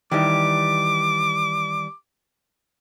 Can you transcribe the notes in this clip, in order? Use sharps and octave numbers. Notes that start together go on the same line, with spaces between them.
D#3 E3 G3 D6